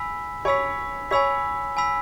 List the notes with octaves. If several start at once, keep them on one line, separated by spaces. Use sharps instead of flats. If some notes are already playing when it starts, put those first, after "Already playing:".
Already playing: G#5 B5 E6 B6
C#5 G#5 B5 E6 B6
C#5 G#5 B5 E6 B6
G#5 B5 E6 B6